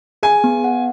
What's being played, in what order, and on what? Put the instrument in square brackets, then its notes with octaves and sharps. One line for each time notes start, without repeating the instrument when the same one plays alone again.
[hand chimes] G#4 [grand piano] G#5
[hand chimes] B3
F#5